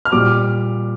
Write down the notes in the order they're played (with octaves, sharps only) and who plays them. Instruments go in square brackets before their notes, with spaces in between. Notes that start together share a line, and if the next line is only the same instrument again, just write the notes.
[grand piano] F6
A#2 G3 D6